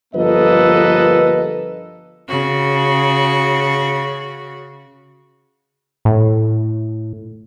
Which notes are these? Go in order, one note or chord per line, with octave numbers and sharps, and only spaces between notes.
G1 F3 A#3 A4 B4 D#5
C#3 F#4
A2